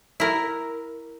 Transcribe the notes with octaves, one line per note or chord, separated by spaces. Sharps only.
E4 A#4